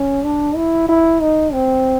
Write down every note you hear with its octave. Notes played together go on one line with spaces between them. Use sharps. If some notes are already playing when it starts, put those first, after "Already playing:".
Already playing: C#4
D4
E4
E4
D#4
C4